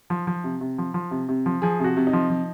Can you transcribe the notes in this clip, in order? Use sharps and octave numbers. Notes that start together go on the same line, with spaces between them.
F3
F3
C3
C3
F3
F3
C3
C3
F3
F3 G#4
C3 F#4
C3
D#4
F3
F3